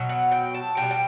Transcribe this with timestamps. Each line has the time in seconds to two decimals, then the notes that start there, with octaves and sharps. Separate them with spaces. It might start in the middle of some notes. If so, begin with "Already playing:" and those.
Already playing: B2 F#3
0.09 F#5
0.32 G5
0.54 A5
0.77 B2 G5
0.82 G3
0.91 G5